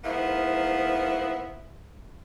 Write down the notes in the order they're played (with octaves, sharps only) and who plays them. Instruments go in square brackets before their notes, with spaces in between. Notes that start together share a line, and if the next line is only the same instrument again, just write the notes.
[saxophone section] G#2 F3 A#3 B3 E4